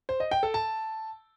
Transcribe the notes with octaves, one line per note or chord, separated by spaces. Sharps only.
C5
D#5
G5
A4
A5